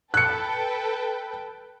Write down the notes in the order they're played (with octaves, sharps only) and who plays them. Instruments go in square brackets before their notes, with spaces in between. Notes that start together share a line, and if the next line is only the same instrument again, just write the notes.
[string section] A4 B4 G5 [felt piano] F#6 C#7